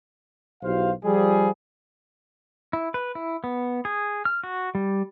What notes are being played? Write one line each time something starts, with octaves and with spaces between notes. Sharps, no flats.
B1 E4 F#4 G4 C5 F5
F3 G3 G#4
E4
B4
E4
B3
G#4
F6
F#4
G3